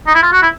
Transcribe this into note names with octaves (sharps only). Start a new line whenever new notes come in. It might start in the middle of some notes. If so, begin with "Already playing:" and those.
D#4
E4
F4
F#4
E4